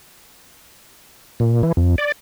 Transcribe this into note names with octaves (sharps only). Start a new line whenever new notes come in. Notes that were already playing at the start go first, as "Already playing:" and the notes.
A#2
E3
F2
D5